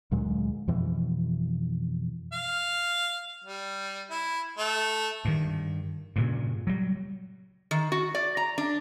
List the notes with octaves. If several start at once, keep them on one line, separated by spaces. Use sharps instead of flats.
D2 A#2 F#3 G#3
F2 B2 E3 F3
F5
G3
E4
A3
G2 D#3
G2 A#2 C#3
F#3 G3
D#3
F#4
D5
A#5
D4